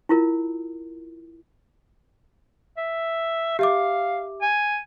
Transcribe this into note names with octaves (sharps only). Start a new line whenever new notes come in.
E4 F4 A#4
E5
G4 E5 F5 D6
G#5